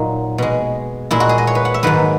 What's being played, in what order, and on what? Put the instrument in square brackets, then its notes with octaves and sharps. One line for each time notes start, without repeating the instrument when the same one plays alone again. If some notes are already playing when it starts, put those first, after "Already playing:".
Already playing: [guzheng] A#2 F#3 D#4
B2 G#3
A#2 G#3 E4
F#4
G#4
D#5
C#5
B4
F#5
E5
G#2 D#3 F#3 B4